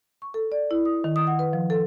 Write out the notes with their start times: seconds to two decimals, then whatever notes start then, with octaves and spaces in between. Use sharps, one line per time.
0.22 C#6
0.34 A4
0.52 D5
0.71 E4
0.85 D#6
1.04 D#3
1.16 D#6
1.27 F#5
1.39 B4
1.53 F3
1.70 A4